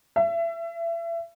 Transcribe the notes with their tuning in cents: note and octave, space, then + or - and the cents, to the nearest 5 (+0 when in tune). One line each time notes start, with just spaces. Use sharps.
E5 +30